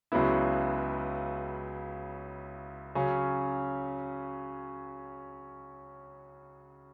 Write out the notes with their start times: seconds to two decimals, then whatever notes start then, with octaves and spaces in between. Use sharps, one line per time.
0.12 C#2 C#3 F#3 B3 E4
2.95 C#3 F#3 C#4